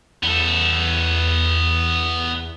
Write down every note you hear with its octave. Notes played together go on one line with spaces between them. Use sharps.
E2 B3 A4